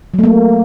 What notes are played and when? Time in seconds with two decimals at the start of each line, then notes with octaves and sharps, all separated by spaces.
0.14 F#3
0.19 A3
0.24 A#3